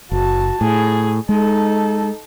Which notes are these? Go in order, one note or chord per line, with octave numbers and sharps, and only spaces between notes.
F#1 F#4 A5
A2 G#4
G#3 D#4 A4